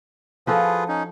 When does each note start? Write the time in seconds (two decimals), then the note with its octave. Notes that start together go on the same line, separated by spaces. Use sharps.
0.47 F3 F4 F#4 G#4 A4 B4
0.88 C#4 D#4